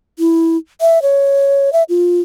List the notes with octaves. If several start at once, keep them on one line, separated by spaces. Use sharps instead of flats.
E4
E5
C#5
E5
F4